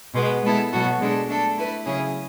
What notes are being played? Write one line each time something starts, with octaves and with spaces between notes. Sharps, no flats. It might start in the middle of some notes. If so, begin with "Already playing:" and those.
B2 G#3 B3
G#3 B3 E4 A4
B2 F#3 B3 F#4 A4
B2 G#3 D4 A4
A3 D4 A4
A3 E4 B4
C#3 F#3 C#4 E4 G#4